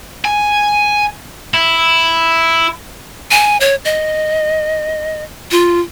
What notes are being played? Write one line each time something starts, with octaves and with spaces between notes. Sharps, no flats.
G#5
E4
G#5
C#5
D#5
F4